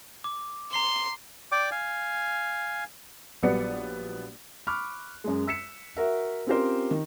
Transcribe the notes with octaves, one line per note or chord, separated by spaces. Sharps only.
D6
A#5 C6 C7 G7
D5 G5 D6
F5 G#5
A#1 F#3 G3 B3 D5 C#7
B5 C#6 D6 F6 F#6
F#2 G#3
E6 B6 C#7 E7
F#4 A#4 E5
C4 C#4 F4 G4 A#4 C5
D#3